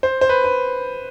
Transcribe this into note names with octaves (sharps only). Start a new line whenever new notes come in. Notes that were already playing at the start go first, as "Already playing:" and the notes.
C5
C5
B4
B4